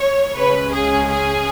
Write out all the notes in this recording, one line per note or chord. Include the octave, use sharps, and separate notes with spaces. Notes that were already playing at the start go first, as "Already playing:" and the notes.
Already playing: C#5
C#2 C#3 G#3 C#4 B4
G#4
G#4